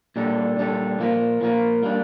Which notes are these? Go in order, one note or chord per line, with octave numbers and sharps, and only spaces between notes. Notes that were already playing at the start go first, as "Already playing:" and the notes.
A#2 G3 D4 A4
A#2 G3 D4 A4
A#2 F3 A#3 F4 A#4
A#2 F3 A#3 F4 A#4
G3 A#3 D4